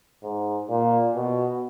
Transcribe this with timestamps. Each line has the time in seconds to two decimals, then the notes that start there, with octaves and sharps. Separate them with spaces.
0.23 G#2
0.69 A#2
1.16 B2